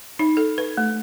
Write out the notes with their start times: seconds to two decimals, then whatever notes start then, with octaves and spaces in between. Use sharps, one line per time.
0.19 D#4
0.37 A4
0.58 B4
0.77 A3